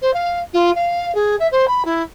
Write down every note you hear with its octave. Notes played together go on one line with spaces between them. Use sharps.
C5
F5
F4
F5
G#4
E5
C5
B5
E4